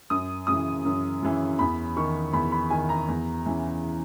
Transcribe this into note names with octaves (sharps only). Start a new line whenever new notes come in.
F#2 D#6
C#3 E3 D#6
F#2
C#3 E3
E2 B5
D#3 C#6
E2 B5
B5
D#3 G#5
A#5
E2
C#3 E3